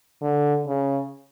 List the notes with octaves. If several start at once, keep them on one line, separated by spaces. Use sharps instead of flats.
D3
C#3